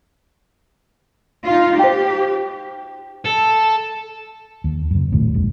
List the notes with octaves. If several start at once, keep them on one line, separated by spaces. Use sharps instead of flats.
D#4 F4
G4 C5 G5
A4
D#2
F#2 C#3
A#1 D#2 A2
A#1 F2 G#3